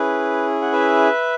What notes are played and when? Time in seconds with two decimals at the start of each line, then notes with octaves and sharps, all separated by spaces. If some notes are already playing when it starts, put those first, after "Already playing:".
Already playing: C#4 E4 G#4 B4
0.62 F#5
0.72 B4 E5